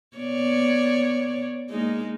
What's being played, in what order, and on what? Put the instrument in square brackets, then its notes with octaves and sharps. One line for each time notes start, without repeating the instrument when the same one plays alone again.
[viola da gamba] B3 C#5 D5
G#3 A#3 D#4